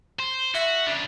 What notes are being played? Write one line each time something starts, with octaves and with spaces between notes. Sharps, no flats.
C5
F#4 E5
C#3 D4